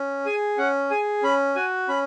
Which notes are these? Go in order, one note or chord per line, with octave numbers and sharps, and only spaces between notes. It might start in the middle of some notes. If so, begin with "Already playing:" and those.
Already playing: C#4
G#4 G#5
C#4 F#5
G#4 G#5
C#4 B5
F#4 G#5
C#4 B5